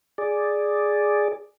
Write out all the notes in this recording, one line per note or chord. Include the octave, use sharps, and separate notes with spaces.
G#4 D5